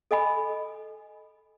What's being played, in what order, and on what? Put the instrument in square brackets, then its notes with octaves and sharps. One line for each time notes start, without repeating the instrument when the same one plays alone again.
[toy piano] A4 D#5 G#5 B5